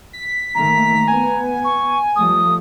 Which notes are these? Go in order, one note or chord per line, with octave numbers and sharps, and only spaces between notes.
B6
D#3 A3 A#3 A#5
B3 G#5
C#6
F3 G3 A3 D#6